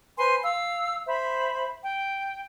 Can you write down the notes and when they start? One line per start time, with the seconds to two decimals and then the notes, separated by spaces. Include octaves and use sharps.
0.18 B4 C5 G#5 C6
0.42 F5 E6
1.07 C5 E5 B5
1.84 G5